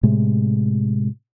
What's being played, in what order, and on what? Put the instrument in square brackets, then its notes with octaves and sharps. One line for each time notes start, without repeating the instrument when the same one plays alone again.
[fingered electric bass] A2 C3 G#3